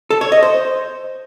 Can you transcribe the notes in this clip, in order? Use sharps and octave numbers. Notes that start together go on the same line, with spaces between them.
A4
C#5
D#5
C5